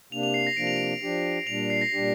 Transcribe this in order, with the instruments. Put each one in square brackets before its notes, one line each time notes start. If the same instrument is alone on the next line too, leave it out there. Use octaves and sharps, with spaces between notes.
[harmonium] C3 A#3 D4 [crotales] F7
[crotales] F7
C7
A#6
[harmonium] C3 F3 A#3 D4 [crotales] D7
[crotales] F7
D7
[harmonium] F3 D4 G4
[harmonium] A#2 G3 D4 [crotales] F7
[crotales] F7
C7
A#6
[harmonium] A#2 G3 D4 G4